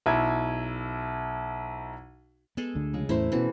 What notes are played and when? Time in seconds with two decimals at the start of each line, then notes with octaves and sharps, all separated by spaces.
0.06 B1 E4 G#6
2.57 G#3 B3 G#4 A4
2.75 D2 D3
2.93 C#3 G#3 F4
3.09 E2 A2 A3 C#4 E4 A#4 C5
3.32 B2 E3 B3 C#4 F#4